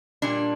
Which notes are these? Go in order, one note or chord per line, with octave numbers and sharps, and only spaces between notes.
A#2 G3 A#3 D4